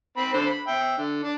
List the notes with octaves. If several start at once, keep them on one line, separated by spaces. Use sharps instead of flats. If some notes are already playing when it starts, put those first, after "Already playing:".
C4 B5
D3 C5
B5
E5 G5
D3
D4